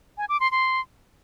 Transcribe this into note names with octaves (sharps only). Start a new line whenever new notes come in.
G#5
D6
C6
C6